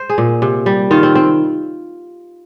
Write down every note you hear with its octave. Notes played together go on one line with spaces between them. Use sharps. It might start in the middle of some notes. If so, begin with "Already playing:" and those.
Already playing: C5
G#4
A#2
C3
G3
D#3 F4
C4
C4